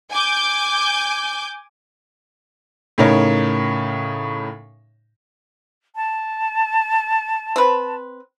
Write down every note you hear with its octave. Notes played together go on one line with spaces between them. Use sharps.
G#5 D6 G6
A2 C#3 D#4 A#4 C#5
A5
C4 B4